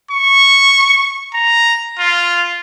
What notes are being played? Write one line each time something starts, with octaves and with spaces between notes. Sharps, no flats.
C#6
A#5
F4